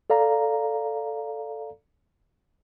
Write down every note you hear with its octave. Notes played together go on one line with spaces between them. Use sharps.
A4 D5 F5 A#5